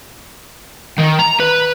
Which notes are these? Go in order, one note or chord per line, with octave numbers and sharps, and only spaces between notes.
D#3
A#5
B4